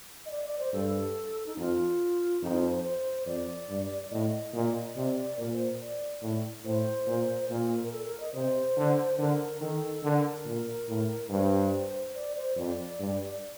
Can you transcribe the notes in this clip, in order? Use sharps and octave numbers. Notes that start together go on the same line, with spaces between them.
D#5
D5
D5
C5
G2 A4
D#4
F2 F4
F2 D#4
C5
C5
C5
F2 D5
G2
A2 D#5
A#2
C3 D5
A#2 A#4
C5
D5
A2
A2 C5
A#2
A#2 A#4
A#4
A4
A#4
D#5
C3 C5
D3
D3 A#4
D#3 A4
D3 A#4
A#2
A2
G2 C5
D5
C5
F2 D5
G2